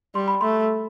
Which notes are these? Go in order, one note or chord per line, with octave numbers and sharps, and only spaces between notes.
G3 C6
B5
A3 C6